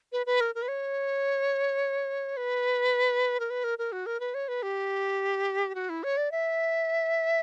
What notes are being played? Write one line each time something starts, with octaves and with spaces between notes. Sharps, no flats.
B4
B4
A#4
A#4
B4
C#5
B4
A#4
B4
A#4
A#4
F#4
A#4
B4
C#5
B4
G4
F#4
E4
C#5
D5
E5